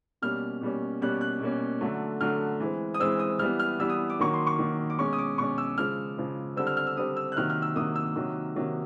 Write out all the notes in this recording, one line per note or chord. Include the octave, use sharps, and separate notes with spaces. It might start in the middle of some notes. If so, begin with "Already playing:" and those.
B2 G3 A#3 C#4 F6
B2 G3 A#3 C#4
B2 G3 A#3 C#4 F#6
F#6
B2 G3 A#3 C#4
D3 F#3 A3
D3 F#3 A3 F6
E3 G#3 C4
D#6
E3 G#3 C4 E6
D#6
E3 G3 B3 F6
F6
E3 G3 B3 E6
D#6
D6
D#3 F#3 A#3 C#6
C6
C#6
D#3 F#3 A#3
D6
B2 G#3 C#4 C#6
D#6
D6
B2 G#3 C#4 C#6
E6
C#3 F3 G#3 F6
C#3 F3 G#3
D3 G3 C4 E6
F6
F6
E6
D3 G3 C4 D#6
E6
F#6
C3 D#3 F#3 A#3 F6
F6
E6
C3 D#3 F#3 A#3 D#6
E6
C3 D#3 F#3 A#3
C3 D#3 F#3 A#3